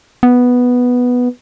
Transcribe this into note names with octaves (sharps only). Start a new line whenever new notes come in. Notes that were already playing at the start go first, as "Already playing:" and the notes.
B3